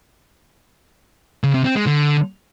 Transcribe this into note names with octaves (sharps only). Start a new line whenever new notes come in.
C#3
C3
C4
G#3
D3